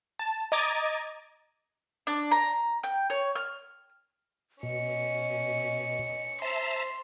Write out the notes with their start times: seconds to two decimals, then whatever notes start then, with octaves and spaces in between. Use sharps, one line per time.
0.19 A5
0.52 D#5 A#5 D6 G#6 A6 D#7
2.07 D4
2.31 A#5
2.84 G5
3.10 C#5
3.36 F6
4.63 B2 C#4 D#5 C#7
6.42 C5 E5 A5 A#5 C6